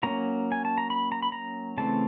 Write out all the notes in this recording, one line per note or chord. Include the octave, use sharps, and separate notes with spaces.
F#3 A#3 C#4 A#5
G#5
A5
A#5
B5
A#5
B5
A#5
C#3 E3 A3 C4 A5